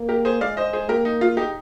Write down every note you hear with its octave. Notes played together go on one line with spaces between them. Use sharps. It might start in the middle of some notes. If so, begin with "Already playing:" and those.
Already playing: A#3
G4 A#4
G#4 C5
G#3 D5 F5
C5 D#5
G#4 C5
A#3 G4 A#4
D#4
F4
D#4 G4